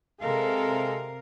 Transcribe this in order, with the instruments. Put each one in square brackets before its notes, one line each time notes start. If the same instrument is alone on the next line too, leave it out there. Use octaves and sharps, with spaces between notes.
[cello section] C3 A#4 F5 [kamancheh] G#3 A4